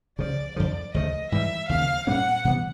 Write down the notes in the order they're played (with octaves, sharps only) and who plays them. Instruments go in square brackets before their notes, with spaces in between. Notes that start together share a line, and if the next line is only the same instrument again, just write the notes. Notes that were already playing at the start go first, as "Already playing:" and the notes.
[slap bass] C#2 C#3 F3 [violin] D5
[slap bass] F2 D3 F3 [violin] D5
[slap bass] D2 C#3 F3 A3 [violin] D#5
[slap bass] G#2 E3 G3 [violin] E5
[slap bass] D#2 C#3 F3 A#3 [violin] F5
[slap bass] A#2 G3 A#3 C#4 [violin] F#5
[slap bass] C3 E3 G3 B3